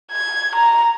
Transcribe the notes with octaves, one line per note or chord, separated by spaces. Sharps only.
G#6
A#5